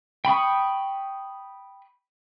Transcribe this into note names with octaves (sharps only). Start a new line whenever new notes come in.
G5 B5 C#6 D#6